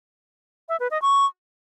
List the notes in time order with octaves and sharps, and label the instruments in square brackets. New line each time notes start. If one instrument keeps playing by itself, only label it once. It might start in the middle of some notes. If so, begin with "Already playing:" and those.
[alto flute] E5
B4
D#5
C#6